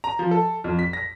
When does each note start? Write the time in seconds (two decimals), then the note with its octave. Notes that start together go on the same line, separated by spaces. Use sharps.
0.04 A#5
0.19 F3
0.31 A4
0.64 F2
0.79 B6
0.93 A#6